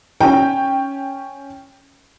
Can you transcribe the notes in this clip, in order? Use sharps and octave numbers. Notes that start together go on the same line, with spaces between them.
C#4 G5